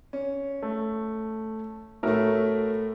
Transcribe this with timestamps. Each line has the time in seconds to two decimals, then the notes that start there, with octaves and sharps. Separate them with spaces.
0.13 C#4
0.62 A3
2.03 A2 A3 F#4 A#4 E5